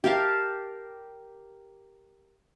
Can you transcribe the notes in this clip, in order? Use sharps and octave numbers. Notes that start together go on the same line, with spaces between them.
G4 A#4 F5 A5